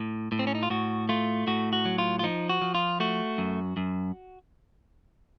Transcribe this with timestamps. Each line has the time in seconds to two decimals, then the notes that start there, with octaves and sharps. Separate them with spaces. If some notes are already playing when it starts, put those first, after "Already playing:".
Already playing: A2
0.32 A2
0.39 C4
0.47 C#4
0.55 D#4
0.63 F4
0.70 A2 F#4
1.09 A3 F4
1.47 A2 F#4
1.73 F#4
1.85 F#3
1.98 F4
2.19 F4
2.24 F3 D#4
2.49 F#4
2.62 F3
2.75 F4
3.00 A3 F#4
3.38 F#2
3.77 F#2